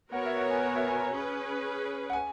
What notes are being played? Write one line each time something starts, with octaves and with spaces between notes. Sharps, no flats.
B3 F#4 A#4 C#5 F#5
E5
F#5
G#5
G#5
E5
G#5
A#5
C#4 G#4 B4 G#5
F#5
G#5